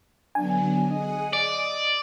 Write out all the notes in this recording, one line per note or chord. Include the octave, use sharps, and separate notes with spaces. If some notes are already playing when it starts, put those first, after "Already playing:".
D3 F#3 B3 D4 G#5
G#4 D#5 F#5
D5 D#6